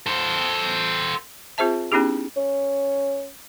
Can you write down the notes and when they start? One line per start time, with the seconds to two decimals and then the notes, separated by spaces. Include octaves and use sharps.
0.06 A4 C5
1.58 C4 F4 G#4 C5 E5 A5
1.92 B3 C#4 D#4 E4 G4 G#4
2.37 C#4